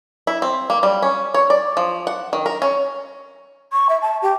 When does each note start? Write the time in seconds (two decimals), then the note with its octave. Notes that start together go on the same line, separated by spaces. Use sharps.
0.27 E4
0.42 C4
0.70 A#3
0.83 G3
1.02 C#4
1.34 C#5
1.50 D5
1.77 F3
2.07 F#5
2.33 D#3
2.46 A#4
2.62 C#4
3.72 C#6
3.89 E5
4.01 A5
4.22 G4